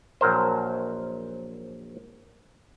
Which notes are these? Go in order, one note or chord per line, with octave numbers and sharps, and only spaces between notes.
A#1 F#3 A#4 C5